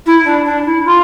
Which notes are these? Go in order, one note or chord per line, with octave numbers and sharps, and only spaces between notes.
E4
D4
D4
E4
F4